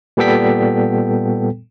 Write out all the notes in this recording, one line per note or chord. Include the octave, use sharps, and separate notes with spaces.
A#2 G3 B3 A4 G5 B6